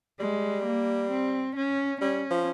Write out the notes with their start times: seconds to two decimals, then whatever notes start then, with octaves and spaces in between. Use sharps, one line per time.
0.20 G3 G#3
0.66 A#3
1.10 C4
1.56 C#4
2.01 G3 C#4
2.31 F3